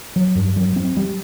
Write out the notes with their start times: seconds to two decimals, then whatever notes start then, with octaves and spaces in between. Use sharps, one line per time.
0.16 F#3
0.36 G2
0.56 F#3
0.76 C4
0.97 G3